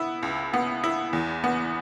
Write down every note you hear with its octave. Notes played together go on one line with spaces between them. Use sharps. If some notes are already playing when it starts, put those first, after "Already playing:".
Already playing: B3 E4
C#2
B3
E4
E2
B3